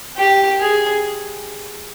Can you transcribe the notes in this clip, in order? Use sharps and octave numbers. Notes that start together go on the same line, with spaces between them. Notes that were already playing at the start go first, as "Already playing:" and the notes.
G4
G#4